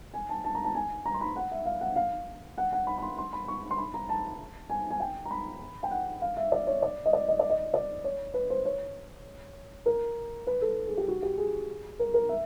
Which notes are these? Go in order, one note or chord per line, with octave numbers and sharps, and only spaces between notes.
G#5
A5
A5
A#5
A5
G#5
A#5
C6
B5
F#5
E5
F5
F#5
F5
F#5
F#5
B5
B5
C6
C6
B5
C#6
C6
B5
A#5
A5
G#5
G#5
G5
A#5
B5
G5
F#5
F5
E5
D5
C#5
D5
D#5
D5
D#5
D5
D#5
D5
C#5
B4
C5
C#5
A#4
B4
A4
G#4
G4
F#4
G4
G#4
A#4
A#4
E5